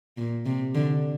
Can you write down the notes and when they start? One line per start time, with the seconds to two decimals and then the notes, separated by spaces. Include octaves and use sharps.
0.17 A#2
0.46 C3
0.75 D3